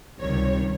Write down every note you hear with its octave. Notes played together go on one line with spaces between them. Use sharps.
C#2 C3 D#3 G3 C#5